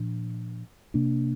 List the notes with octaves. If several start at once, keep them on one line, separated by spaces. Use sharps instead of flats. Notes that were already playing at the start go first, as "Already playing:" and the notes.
Already playing: A#2 F3 D4
C3 A#3 D4